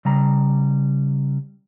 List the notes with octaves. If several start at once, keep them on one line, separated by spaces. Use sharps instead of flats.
C#3 G3 A#5